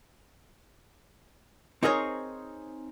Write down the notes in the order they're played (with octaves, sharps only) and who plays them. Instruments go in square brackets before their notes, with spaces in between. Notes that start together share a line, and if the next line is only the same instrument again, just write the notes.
[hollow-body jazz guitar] C4 D#4 G#4 A#4 C5 C#5